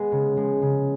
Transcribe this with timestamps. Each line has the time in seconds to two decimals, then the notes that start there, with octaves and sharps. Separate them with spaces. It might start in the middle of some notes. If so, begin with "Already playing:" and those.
Already playing: G#3 B3
0.12 C#3
0.37 F3 G#3
0.62 C#3